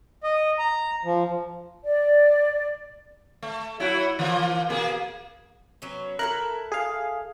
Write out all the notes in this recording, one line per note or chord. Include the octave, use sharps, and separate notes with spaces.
D#5
A#5
F3
D5
A3
F#3 E4 F#4
E3 F3 A#3
B2 A#3 G#4
F#3 B3 C#4
E4 F4 A4 A#4 F#6
G#4 F5